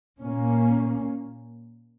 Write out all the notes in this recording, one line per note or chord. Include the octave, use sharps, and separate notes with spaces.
A#2 A#3 C#4